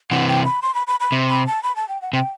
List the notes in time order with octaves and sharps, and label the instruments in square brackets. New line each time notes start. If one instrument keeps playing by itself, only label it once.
[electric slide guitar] C3 E3 [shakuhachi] F#5
[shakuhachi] G5
B5
C6
B5
B5
B5
[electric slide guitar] C3
[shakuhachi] B5
A5
B5
A5
G5
F#5
[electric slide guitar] C3 [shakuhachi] G5